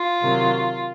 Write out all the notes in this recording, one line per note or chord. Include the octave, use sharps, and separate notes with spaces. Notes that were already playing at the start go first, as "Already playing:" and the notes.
Already playing: F4
C3 D#3 F#3